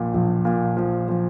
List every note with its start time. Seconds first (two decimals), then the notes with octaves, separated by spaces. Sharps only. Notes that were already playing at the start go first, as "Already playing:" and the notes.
Already playing: A#1 A#2
0.14 A#1
0.45 A#2
0.77 F3
1.08 F3